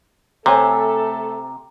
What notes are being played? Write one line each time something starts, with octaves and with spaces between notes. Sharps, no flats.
C3 A3 A4 C5 C#5 G#5 A#5